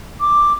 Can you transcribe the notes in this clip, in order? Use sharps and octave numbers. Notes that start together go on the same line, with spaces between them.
D6